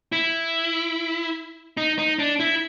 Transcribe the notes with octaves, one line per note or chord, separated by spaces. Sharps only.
E4
D#4
D#4
D4
E4